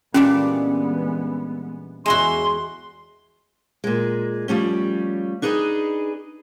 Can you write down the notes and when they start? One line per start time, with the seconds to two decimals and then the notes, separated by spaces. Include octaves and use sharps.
0.14 A#2 E3 G3 G#3 B3 C#4 D4
2.06 E2 G#3 E4 F#4 C6
3.84 A#2 G#3
4.48 F3 G3 A3 C#4
5.42 D4 D#4 G#4 B4 D#5